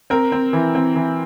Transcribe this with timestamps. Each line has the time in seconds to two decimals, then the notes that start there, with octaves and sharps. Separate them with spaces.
0.10 C4 A#4
0.32 C4
0.53 E3
0.75 C4
0.96 E3